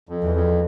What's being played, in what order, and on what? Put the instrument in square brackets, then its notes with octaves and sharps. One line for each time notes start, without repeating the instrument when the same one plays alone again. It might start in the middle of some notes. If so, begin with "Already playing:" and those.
[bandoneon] F2
[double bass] E2
[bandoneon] F2